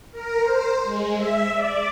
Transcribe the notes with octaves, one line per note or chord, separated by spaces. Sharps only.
A#4
C5
G#3
E5
D5